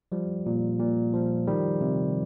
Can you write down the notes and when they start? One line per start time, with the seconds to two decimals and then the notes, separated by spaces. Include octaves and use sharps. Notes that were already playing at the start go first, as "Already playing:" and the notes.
0.12 F3 G3
0.46 A#2
0.80 A#2
1.14 F3
1.47 D#3 G3
1.81 C3